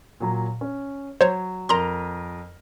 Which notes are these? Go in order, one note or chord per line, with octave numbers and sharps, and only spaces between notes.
A#2 F#3 A#5
C#4
F#3 C5 C#5
F2 A#4 A#5 C6 F7